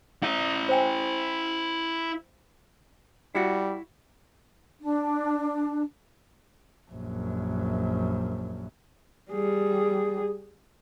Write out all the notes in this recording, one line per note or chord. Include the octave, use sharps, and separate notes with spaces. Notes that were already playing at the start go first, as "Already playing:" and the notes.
E4 A#5
C5 G5 G#5
G3 E4 F#4
D4
A#1 F#2
G3 G#4